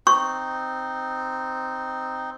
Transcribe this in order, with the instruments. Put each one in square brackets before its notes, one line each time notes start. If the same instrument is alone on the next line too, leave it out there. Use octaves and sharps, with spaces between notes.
[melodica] C4 D#4 [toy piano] C#6